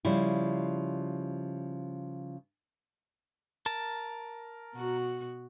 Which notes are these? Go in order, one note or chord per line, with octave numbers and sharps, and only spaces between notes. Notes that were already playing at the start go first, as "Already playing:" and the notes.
C#3 F3 G3 E4
A#4 A5
B2 F#4